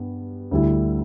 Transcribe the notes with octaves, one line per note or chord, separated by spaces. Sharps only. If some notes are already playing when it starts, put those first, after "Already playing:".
Already playing: G2 G3 B3
D2 D3 G3 E4